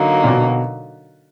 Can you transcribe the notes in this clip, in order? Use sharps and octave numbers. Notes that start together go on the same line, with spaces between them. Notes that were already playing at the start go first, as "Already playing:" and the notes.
Already playing: D3 F#3 A#3 D#4
A#2
B2